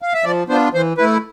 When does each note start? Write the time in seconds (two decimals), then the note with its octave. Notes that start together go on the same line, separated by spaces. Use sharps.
0.02 F5
0.14 E5
0.24 F3 D5
0.48 B3 D4 F4 C5
0.74 E3 C5
0.98 A3 E4 B4